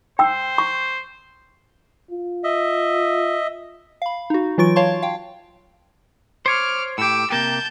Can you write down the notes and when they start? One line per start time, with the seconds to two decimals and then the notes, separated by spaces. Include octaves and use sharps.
0.19 C5 G5 E6
0.58 C#6
2.11 F4
2.44 D#5 E5
4.02 F5 B5
4.30 D#4 F#4
4.58 E3 F#3 F4 C#6 D7
4.76 C#5 F5 A5 C6 C#6
5.02 F5 G5
6.46 C5 C#5 D6 F6
6.98 A2 G4 D6 E6
7.30 C3 A#3 G4 A5 G6